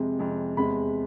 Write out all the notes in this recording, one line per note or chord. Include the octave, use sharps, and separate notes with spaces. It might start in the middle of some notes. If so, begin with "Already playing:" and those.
Already playing: F2 C3 G#3
F2 C3 G#3
E2 C3 G#3 B5